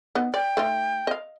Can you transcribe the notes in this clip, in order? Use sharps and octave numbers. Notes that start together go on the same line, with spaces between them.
B3 D#4
D5 G5
A3 D#4 F4
D#5 F5